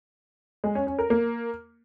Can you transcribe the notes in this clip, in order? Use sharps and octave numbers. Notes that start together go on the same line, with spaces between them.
G#3
C#4
C#4
A#4
A#3